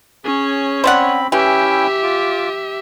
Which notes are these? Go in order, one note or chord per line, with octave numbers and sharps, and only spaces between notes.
C#4 G#4 C#5
C4 C5 D5 F#5 B5
E3 C#4 E4 G4 E5 G5
F4 D6